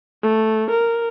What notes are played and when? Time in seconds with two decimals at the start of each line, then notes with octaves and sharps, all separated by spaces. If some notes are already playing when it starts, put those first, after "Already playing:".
0.23 A3
0.70 A#4